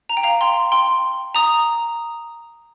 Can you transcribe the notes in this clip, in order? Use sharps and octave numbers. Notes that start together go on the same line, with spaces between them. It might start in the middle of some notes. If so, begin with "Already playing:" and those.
A#5
G5
F5 A#5
G5 C6
G5 C6
A#5 D#6